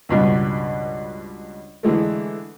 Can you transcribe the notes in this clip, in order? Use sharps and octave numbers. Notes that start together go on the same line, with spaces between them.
C#2 G2 B2
D3 E3 G#3 A3